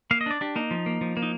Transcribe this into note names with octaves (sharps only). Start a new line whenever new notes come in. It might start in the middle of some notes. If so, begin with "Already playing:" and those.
A#3 F5
D#5
D4 D5
D4 G4
A#3 D#4
F3
A#3
F3
A#3
D#4